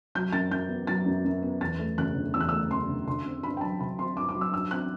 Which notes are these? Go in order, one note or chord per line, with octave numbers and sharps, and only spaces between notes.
F#3 G6
F#2 A6
F#2 G6
B3
F#3 A6
F#2
F#2
B3
E2 A6
A3
F#1 F#6
D3
E2 E6
F#6
A3 E6
F#1 C6
D3
D3 C6
C4
G2 B5
G5
F#3 A5
D3 B5
C4 C6
G2 D6
D6
F#3
E6
G2 E6
C4 F#6